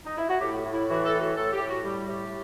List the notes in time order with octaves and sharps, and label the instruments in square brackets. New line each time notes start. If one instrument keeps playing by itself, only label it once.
[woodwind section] D#4
E4
F#4
A2 G4
A2
E4
E3 F#4
A4
A2
F#4
A2 A4
G4
A2
F#4
G3 G4
A2 G4